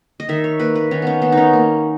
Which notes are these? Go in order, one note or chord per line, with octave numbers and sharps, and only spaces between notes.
D#5
D#3 E5
C#5
A#3 B4
B4
D#3 C#4
B3 C#4
D#3 B3
C#4 D#4
A#3